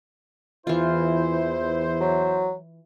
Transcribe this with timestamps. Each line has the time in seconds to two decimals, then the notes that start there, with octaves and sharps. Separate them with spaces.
0.67 E2 E3 E4 F4 C5
2.01 F#3